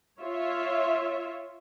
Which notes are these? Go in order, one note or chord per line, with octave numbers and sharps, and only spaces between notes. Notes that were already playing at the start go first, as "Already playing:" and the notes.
F4 C#5 E5